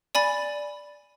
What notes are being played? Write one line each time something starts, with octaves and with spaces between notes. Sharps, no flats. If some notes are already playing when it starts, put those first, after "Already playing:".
D5 G#5 B5 A6